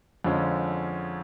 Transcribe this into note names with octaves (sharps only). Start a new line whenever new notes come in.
F2 D3 F3 G#3 C#4